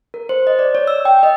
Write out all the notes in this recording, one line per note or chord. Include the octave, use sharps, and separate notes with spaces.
A#4
C5
D#5
D5
C#5
E6
G5
D#5